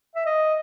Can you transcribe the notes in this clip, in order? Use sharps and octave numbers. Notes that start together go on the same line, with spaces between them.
E5
D#5